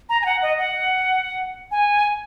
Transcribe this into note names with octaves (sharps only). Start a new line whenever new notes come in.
A#5
G#5
F#5
D#5
F#5
G#5